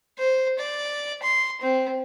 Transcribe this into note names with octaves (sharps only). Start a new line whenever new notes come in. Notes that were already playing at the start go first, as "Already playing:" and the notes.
C5
D5
C6
C4